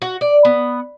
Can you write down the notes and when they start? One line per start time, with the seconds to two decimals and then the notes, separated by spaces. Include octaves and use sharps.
0.02 F#4
0.21 D5
0.45 B3